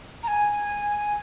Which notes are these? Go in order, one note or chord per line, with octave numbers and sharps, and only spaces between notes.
A#5
G#5